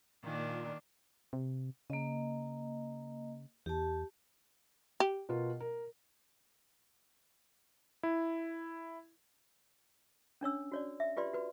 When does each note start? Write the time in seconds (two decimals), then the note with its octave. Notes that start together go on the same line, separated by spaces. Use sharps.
0.24 A#2 D#3 A#3 D4
1.33 C3
1.90 C#3 A#3 D#5
3.66 E2 G4 A5
5.00 G4
5.29 B2 F4 A#4
5.60 A#4
8.03 E4
10.41 C#4 D4 C#5 E6
10.72 F#4 C#5 D5
11.00 E5
11.17 F4 G4 B4 D5 C6
11.34 F#4 B4